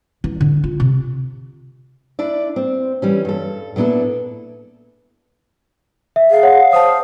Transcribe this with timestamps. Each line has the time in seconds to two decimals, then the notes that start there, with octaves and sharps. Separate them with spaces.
0.24 E3
0.41 D3
0.64 F4
0.80 C3
2.19 D4 E4 D5
2.56 C4
3.02 E3 G3 C#4
3.25 G2 A4
3.76 A#2 B3 D4 E4 A4
6.16 E5
6.31 G#4 F5
6.43 C#5 F#5
6.73 C5 A5 D#6